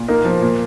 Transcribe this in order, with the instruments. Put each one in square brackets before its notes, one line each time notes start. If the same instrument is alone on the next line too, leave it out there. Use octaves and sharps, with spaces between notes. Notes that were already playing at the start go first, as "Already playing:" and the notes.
Already playing: [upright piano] A#2
[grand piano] A#3 A#4 [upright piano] D#4
[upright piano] F3
A#2